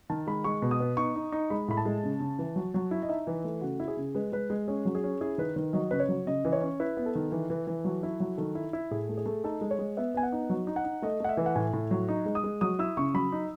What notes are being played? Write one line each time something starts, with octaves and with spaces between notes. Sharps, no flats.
D#3 A5
G#3 B5
G#3 C#6
B2
D#6
B3
D#4 C#6
D#4
D#4
G#3 B5
A2 B5
A5
G#3
C#3
C#3
E3
F#3
F#3
E4
D#5
D#4 E5
E3
A3
C#3 F#4
E4
G#4
C#3
G#3 B4
G#3 B4
G#3
C#4 G#4
F#3
G#4
C#4
E4 G#4
D#3 B4
D#3 B4
F#3 D#5
C#3 B4
C#5
F#3
C#3 D#5
E3
C#5
C#4
E4 B4
B3
A4
D#3
E3
E3
E3
F#3
E4
F#3
D#3 A4
E4
E4
A2 G#4
A3
G#4
A3
D#4 A4
G#3
C#5
G#3
B3 E5
B3 G#5
F#5
D#4
F#3
D#4
F#5
D#4
A3 D#5
A3 F#5
E5
E3
F#5
A2 G#5
A2
F#3
D#4
G#3
D#6
G#3
F#3 D#6
E4 E6
C#3 C#6
F#3 B5
D#4